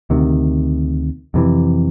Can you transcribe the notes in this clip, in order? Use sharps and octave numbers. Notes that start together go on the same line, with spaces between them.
D2 C3 D#3
F2 C3 E3